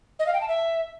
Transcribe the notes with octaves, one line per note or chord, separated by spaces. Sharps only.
D#5
F5
G5
A5
E5